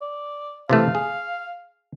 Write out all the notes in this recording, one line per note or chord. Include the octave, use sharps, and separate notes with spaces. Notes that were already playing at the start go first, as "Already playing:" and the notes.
D5
C3 E3 A3 F5
G#4